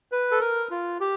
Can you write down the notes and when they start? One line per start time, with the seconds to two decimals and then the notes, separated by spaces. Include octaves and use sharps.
0.12 B4
0.31 A4
0.41 A#4
0.71 F4
1.00 G4